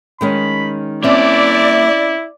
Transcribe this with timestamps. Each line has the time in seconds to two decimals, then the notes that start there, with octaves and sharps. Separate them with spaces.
0.21 D#3 G#3 C#4 B5
1.04 A#3 C4 C#4 E4 D5 E5